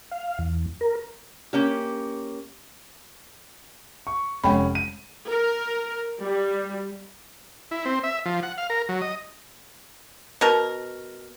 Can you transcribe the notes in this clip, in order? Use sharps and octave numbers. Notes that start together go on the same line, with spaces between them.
F5
E2
A#4
A#3 C#4 G4
C#6
F1 G#3 C#4 G5 B5
D#7
A#4
G3
E4
C4
E5
F3
F#5
F5
A#4
F#3
D#5
B2 A#4